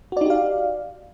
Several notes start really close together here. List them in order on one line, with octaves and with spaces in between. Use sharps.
F#4 D5 D#4 G4 F5